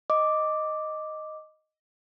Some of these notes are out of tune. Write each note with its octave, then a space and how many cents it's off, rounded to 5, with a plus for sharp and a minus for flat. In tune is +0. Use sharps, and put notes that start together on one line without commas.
D#5 +0 D6 +0